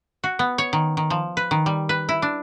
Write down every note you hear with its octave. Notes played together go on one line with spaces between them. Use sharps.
F#4
B3
C#5
D#3
D#3
F3
B4
D#3
G3
B4
E4
D4